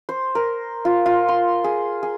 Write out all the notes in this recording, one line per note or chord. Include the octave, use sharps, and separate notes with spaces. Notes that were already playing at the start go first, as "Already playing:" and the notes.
C5
A#4
F4
F4
C6
G#4
G#4